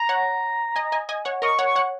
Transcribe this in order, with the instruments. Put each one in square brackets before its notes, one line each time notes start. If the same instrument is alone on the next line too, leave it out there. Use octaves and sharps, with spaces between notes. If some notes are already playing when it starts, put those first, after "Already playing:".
Already playing: [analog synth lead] A#5
[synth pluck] C#5 F#5
D#5 G#5
D#5 G#5
D#5 G#5
C#5 F#5
[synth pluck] A#4 D#5 [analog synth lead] C#6
[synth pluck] C#5 F#5
[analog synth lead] C#6
[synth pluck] C#5 F#5